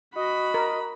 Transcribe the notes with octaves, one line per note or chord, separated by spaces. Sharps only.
F#4 D#5 B5
A#4